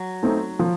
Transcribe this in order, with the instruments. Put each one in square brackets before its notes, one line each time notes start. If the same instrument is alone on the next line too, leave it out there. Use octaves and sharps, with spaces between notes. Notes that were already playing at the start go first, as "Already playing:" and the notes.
Already playing: [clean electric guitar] F#3
[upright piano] A3 C4 D#4
F3